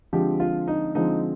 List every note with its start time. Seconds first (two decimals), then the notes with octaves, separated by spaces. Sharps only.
0.13 D3 F3 G#3 C4 G4
0.40 F4
0.68 D#4
0.95 D3 F3 G#3 C4 D#4